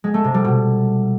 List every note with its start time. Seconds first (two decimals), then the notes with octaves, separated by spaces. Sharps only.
0.04 G#3
0.14 A3
0.24 C3
0.34 G3
0.44 B2